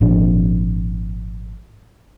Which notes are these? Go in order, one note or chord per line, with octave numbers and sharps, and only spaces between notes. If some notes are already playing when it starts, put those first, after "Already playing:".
G#1 A#2 F3 D4